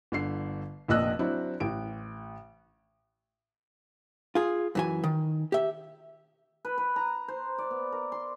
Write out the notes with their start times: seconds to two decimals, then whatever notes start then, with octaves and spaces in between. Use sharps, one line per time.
0.12 G1 D3 C7
0.88 F1 A#1 A#2 D#5 E6 F#6
1.19 F#3 C4 D4 E4
1.60 A1 D7
4.35 F4 G#4
4.75 F#2 E3 G#5
5.04 D#3
5.52 G4 E5
6.65 B4
6.78 B4
6.96 A#5
7.28 C5
7.58 D5
7.71 B3
7.92 A#4
8.12 C6